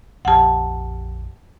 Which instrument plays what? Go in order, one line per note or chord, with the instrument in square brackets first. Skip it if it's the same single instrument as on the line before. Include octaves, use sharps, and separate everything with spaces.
[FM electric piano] A#1 F2 G4 [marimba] F#5 A5